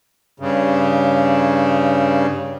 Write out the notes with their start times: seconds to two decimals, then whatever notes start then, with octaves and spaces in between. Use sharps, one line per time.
0.40 G2 C#3